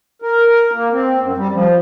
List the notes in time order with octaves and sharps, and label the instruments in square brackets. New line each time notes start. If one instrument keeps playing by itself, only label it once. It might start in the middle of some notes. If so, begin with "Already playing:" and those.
[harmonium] A#4
A#3
C4
F#2
G3
F3